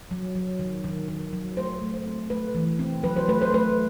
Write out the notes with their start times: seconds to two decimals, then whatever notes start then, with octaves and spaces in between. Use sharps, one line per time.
0.11 F#3
0.35 F#3
0.59 D#3
0.84 D#3
1.09 D#3
1.33 F#3
1.57 A3 C5
1.82 A3
1.94 C5
2.06 C4
2.30 A3 B4
2.55 E3
2.79 C4
3.04 F#3 B4
3.16 C5
3.28 A3 B4
3.42 C5
3.53 A3 B4